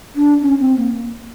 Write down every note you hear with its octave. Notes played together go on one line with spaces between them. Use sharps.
D4
C#4
C4
A#3